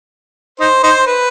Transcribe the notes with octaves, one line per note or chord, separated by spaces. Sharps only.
D#4 C5
D#4 C5
B4